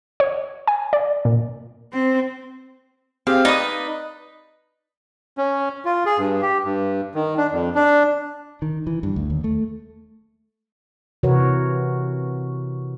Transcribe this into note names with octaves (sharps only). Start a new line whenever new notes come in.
C#5
G#5
D5
A#2
C4
C4 G4 G#4 F5
D#4 B4 D5 D#6
C#4
F4
G#4
G2
G4
G2
D#3
D4
F2
D4
D#3
E3
G2
D2
D#2
A3
C3 E3 F#4 A#4 B4 C#5